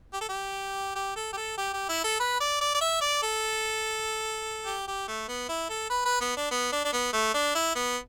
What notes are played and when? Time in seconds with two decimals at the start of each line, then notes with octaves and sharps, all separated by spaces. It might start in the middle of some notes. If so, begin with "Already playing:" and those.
0.13 G4
0.21 A4
0.29 G4
0.96 G4
1.16 A4
1.33 G4
1.37 A4
1.57 G4
1.73 G4
1.89 E4
2.04 A4
2.20 B4
2.40 D5
2.61 D5
2.75 D5
2.81 E5
3.01 D5
3.23 A4
4.66 G4
4.87 G4
5.08 A3
5.28 B3
5.49 E4
5.69 A4
5.90 B4
6.05 B4
6.21 B3
6.37 D4
6.51 B3
6.72 D4
6.85 D4
6.93 B3
7.13 A3
7.34 D4
7.55 E4
7.75 B3